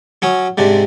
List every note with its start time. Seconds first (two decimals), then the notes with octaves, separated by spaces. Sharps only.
0.22 F#3 C#4 D#6
0.58 G#2 C3 D4